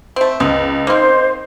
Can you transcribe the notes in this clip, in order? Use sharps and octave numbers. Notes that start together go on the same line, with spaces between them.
A3 C4
C#2 G#3
A#3 C4 D#4 C5